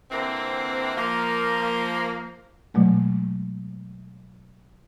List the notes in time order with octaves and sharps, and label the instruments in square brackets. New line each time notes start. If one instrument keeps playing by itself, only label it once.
[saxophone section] D3 E3 A#3 C4
F3 A#3
[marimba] B2 F#3 G#3 A3